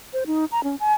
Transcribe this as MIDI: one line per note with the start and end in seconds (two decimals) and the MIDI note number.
0.13 0.24 72
0.27 0.45 63
0.52 0.63 82
0.64 0.76 61
0.80 0.94 80